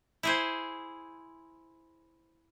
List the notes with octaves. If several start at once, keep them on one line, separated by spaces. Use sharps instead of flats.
E4 G#4 C5